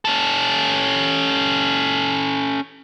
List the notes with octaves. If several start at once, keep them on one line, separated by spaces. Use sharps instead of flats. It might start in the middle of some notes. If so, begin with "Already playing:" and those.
C#4 A4